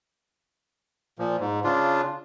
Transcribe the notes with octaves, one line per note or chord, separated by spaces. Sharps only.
A#2 F3
G#2
C#3 D4 F4